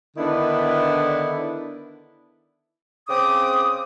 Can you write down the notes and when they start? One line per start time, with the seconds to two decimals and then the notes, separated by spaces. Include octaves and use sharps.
0.17 D3 D#3 B3 D4 E4
3.08 C#3 C4 D6 D#6